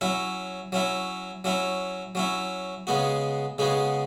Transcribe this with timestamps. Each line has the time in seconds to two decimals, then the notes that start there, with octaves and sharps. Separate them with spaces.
0.01 F#3 C#4 E4
0.72 F#3 C#4 E4
1.44 F#3 C#4 E4
2.15 F#3 C#4 E4
2.87 C#3 G#3 B3 F#4
3.58 C#3 G#3 B3 F#4